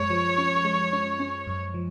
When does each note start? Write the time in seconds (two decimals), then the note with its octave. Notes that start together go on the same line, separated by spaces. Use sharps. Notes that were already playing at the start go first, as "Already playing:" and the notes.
Already playing: F#2 G#3 C#5
0.10 F3
0.38 C#4
0.65 G#3
0.93 C#4
1.19 C#4
1.47 F#2
1.74 F3